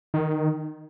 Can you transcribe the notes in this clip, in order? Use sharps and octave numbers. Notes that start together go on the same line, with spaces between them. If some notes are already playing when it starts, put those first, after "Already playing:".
D#3